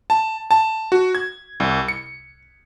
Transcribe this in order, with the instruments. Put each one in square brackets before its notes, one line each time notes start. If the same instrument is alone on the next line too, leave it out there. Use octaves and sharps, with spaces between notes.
[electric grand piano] A5
A5
F#4
G#6
C2
C#7